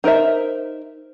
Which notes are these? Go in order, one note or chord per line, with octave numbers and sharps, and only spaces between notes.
D#4 A#4 C5 E5